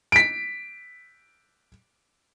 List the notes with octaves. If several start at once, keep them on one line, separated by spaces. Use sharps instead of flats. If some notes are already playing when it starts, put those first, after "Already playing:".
B6 D7